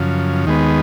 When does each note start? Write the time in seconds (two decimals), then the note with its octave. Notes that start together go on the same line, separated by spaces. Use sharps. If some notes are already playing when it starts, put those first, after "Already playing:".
Already playing: F#2 C#3 F3
0.46 D#2 D#3 G#3 B3